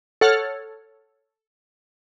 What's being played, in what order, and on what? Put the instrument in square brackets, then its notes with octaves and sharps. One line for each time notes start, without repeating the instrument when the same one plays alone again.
[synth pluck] A4 C#5 F#5 F6